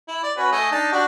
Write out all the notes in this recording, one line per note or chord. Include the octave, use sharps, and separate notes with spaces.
E4
D5
C#4 F#4 B4
A3 D#5 G#5
D4 D#4 A5
D4 F#4 G4